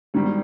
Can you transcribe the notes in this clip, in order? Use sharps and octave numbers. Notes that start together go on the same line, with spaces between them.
G#1 G#2 D#3 G3